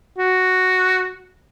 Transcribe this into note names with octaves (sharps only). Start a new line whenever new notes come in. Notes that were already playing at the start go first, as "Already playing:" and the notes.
F#4